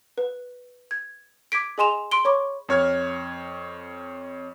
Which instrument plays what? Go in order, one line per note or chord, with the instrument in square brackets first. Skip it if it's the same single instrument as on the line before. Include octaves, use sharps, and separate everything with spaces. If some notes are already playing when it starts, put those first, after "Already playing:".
[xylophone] B4
G#6
D6 G#6 B6 D7
G#4 D#5 G#5 C6 E7 F7
C6 D7 G7
C#5 B5 C#6 D6
[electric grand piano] F2 C#5 F6 G#6